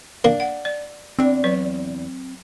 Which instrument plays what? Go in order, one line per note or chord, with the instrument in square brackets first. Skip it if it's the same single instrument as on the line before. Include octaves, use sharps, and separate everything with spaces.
[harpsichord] A#3 [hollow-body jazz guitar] D4
[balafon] F#5
D5
[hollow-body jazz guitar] E2 D4 [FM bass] C4
[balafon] F#3 B4 D5